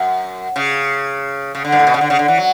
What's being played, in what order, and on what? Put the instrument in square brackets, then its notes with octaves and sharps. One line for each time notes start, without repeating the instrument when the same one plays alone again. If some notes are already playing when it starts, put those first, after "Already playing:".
Already playing: [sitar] F#2
C#3
C#3
D3
G2
A2
B2
C#3
D3
C#3
D3
E3
F#3